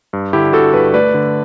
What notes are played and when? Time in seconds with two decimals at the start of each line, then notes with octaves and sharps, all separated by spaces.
0.13 G2
0.33 D3 E4 G4
0.53 D3 F#4 A4
0.73 G2 G4 B4
0.94 A3 B4 D5
1.14 D3